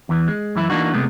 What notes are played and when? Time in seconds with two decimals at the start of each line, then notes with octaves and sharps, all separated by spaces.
0.09 E2 E3
0.28 G#3
0.56 F#2 E3 E4
0.70 E3 A#3 D4 D#4 F#4
0.93 C3 G#3 A3 B3